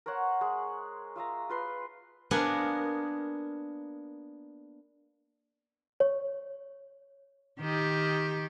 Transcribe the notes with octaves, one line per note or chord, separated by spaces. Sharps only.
A#4 C5 C#5 F#5
G#3
F4 E5 F5 A#5
F4 B4 C6
A#3 B3 D4 G#4 A#4
C#5
D#3 G4